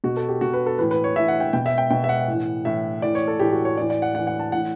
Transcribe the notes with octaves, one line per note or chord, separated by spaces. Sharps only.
B2 F#4
A4
G4
B2 F#4
B4
A4
A2 E3 B4
B4
C#5
A2 E3 E5
F#5
G5
B2 G5
E5
G5
B2 G5
E5
F#5
A2 E3
A2 E3 E5
A2 E3 D5
C#5
A4
A2 E3 G4
F#4
C#5
A2 E3 D5
D5
F#5
A2 E3 F#5
F#5
A5
A2 E3 F#5